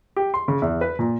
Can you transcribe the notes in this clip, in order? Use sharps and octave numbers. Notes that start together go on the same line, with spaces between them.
G4
C6
C#3
E2
B4
A#2